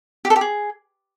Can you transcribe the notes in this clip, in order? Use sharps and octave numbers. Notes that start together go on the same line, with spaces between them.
G4
A4
G4
G#4